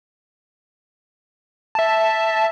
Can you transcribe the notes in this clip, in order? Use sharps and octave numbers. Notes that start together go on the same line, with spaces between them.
E5 A5